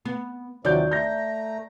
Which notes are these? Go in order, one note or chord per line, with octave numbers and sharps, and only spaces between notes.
B3
D#2 C3 F3 F#3 F#4 D5 G6
A3 A#5 G6 A#6